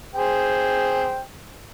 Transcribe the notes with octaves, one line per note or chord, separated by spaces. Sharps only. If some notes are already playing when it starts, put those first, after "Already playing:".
G#4 C5 G5